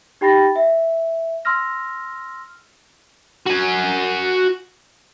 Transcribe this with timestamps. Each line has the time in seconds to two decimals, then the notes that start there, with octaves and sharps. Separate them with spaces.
0.21 D#4 G4 G5 B5 A6 A#6
0.56 E5
1.45 C6 E6 F6 A#6
3.47 F#4 G#5